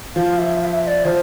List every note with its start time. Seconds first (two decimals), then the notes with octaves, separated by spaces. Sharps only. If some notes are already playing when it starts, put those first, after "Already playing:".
0.16 F3 F5
0.38 E5
0.61 F5
0.64 E5
0.83 E5
0.87 D5
1.05 F3 C5